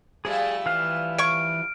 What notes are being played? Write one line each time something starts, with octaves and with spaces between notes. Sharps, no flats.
F3 G3 A3 G#4
E3 F5
C#5 C#6 F6 D7